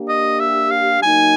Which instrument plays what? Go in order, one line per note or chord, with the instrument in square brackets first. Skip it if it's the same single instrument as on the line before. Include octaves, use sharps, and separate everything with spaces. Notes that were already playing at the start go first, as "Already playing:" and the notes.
Already playing: [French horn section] A#3 D4 G4
[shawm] D#5
E5
F5
[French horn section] F#3 A#3 D#4 [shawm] G#5